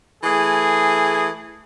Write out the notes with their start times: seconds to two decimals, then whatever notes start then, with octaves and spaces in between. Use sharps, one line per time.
0.24 E3 A3 G#4